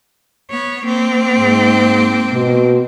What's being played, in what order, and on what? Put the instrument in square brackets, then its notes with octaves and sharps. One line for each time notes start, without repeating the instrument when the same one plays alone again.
[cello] B3 C#5
A#3 C4
[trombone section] G#2
B2